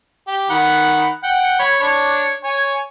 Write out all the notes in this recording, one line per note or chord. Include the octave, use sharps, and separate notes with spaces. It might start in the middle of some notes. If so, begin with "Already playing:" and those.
G4
D#3 F#5 B5
F#5 G5
C#5 B5
D4 C#5
C#5 G#5